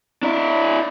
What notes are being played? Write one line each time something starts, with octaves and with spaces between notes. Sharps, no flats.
D4 E4